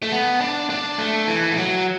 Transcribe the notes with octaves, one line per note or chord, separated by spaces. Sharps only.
A3
B3
D4
D4
A3
E3
A3
F#3